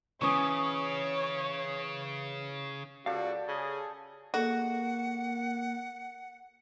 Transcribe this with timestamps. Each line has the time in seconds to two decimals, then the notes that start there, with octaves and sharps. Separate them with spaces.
0.22 C#3 E3 C#4 C#5 C#6 D#6
3.06 C#2 F#4 G4 A4 D5 F5
3.48 C#3 G#4
4.34 A#3 F#4 G#4 A4 D#5 F#5